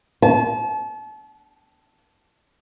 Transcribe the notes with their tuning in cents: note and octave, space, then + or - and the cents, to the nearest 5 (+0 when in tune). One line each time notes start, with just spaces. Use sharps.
A5 -35